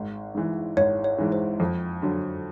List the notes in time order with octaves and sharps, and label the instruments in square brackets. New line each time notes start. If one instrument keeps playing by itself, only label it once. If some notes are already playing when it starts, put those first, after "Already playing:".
Already playing: [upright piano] G#1
G#2 E3
[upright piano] G#1 [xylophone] C#5
[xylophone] C#5
[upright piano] G#2 E3
[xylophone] C5
[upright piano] F2
D3 F#3